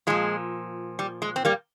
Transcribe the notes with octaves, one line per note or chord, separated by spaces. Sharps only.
A#2 F3 G#3
G3
G#3
C4
G3 A#3